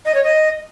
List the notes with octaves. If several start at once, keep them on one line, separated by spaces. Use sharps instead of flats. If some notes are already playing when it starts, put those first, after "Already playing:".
D#5
C#5
D#5